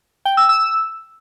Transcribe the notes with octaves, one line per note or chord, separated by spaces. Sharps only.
G5
E6
E6